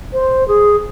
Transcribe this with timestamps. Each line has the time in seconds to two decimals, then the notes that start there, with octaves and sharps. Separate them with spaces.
0.13 C5
0.48 G#4